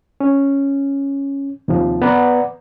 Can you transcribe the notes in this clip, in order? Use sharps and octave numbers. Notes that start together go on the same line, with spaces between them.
C#4
D#2 C3 F3
B3 B4 D5 F#5 A#5